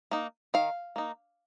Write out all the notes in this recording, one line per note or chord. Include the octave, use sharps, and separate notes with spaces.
A#3 D#4
D#3 F5
A#3 D#4